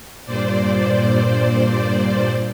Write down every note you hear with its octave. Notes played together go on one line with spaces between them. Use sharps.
G2 A#2 C5 D5